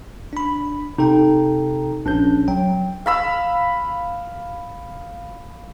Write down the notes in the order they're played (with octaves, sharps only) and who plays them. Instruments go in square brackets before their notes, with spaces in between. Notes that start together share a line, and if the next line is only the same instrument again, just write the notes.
[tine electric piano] D4 B5
[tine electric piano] C3 A4 G5 [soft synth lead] D#4
[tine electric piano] A#1 C#4 G6 [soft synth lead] D4
[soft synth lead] F#3 [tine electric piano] G5
[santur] F5 B5 E6